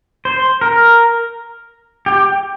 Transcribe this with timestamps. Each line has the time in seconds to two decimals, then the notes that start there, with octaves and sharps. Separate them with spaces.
0.25 C5
0.61 A#4
2.06 G4